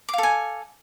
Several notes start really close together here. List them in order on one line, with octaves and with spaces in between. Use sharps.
D6 F5 A4 G#5